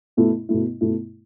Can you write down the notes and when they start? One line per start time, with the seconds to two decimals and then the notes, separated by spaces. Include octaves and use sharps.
0.17 B2 A3 E4
0.49 B2 A3 E4
0.81 B2 A3 E4